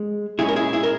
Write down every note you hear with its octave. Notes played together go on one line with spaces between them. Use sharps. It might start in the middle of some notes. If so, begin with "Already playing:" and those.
Already playing: G#3
A#2 G#3 C#4 E4 G#4
A#4
E4 G#4
E4 G#4
A#4